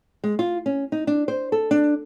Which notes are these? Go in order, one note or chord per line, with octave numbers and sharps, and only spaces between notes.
G#3
F4
C#4
D#4
D4
C5
A4
D4